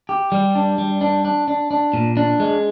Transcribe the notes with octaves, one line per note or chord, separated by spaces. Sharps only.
G4
G3
D4
G3
D4
D4
D4
D4
A#2
D4
G#3